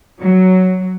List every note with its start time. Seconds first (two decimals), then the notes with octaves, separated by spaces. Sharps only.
0.20 F#3